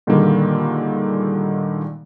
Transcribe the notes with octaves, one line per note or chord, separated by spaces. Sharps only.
A#2 D3 D#3 G3 G#3 A#3